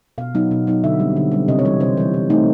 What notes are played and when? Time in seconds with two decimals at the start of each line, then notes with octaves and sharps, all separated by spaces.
0.18 B2 F5
0.35 F#3 B3 D#4
0.51 B2
0.67 F#3 B3 D#4
0.84 D3 E5
1.00 G3 C4
1.16 D3
1.32 G3 C4
1.48 C3 D#5
1.59 C#5
1.65 E3 G3
1.80 C3 C5
1.97 E3 G3
2.14 E3
2.30 A3 C4 D#4